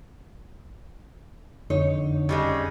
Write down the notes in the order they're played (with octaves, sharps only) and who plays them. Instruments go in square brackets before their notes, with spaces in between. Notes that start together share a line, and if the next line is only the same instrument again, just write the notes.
[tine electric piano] F2 [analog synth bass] D3 [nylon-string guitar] D#4 C#5
[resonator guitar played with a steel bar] C#3 G3 G#3